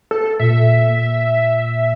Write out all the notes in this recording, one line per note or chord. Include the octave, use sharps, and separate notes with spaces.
A4
A#2 E5
A#2